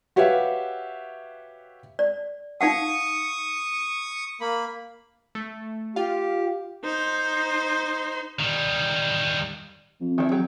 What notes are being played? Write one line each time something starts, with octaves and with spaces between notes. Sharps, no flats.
F#4 G4 B4 C#5 E5 F5
D5
D#4 F5 F#5 C#6 D#6
A#3 B5
A3
F4 G4 F5
D#4 C5
D#3 G3
F2
D#3 D#4 E4
F#3 G4